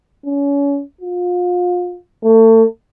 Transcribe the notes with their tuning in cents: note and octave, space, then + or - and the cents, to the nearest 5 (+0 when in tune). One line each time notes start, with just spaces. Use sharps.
C#4 +30
F4 +30
A3 +35